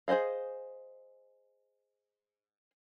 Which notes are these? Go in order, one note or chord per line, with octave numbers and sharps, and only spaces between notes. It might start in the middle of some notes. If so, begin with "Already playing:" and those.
G#4 C5 D5 D#5 F5